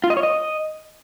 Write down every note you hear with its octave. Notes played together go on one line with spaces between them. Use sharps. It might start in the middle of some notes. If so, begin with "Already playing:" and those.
F4
D#5
C#5
D#5